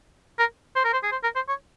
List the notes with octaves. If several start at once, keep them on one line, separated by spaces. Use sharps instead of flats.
A#4
C5
A#4
C5
G#4
C5
A#4
C5
C#5